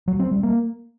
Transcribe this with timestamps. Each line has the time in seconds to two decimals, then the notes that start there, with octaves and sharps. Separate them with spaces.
0.08 F#3
0.19 C4
0.31 G3
0.43 A#3